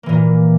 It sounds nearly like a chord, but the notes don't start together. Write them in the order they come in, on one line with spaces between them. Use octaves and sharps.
A#3 E3 A#2